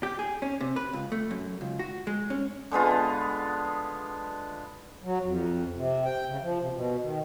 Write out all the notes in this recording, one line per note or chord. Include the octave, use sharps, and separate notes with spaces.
G4
G#4
C#4
C3
B4
C#2
A3
F#2
C#2
F#4
G#3
C#4
D3 G#3 B3 F4
F#3
F2
C3
G5
C#3
F3
C3
B2
D#3